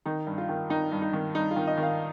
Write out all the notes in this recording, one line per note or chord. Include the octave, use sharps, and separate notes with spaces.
D#3 D#4
G2
F4
D#3
D#3 D#4
G2
D#4
D#3
G2 D#4
F4
D#3
D#5
D#3
F5